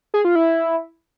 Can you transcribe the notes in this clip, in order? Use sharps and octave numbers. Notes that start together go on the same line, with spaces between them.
G#4
F4
E4